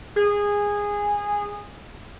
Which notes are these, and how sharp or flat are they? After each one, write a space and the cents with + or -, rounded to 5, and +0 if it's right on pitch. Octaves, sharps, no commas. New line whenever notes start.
G#4 -15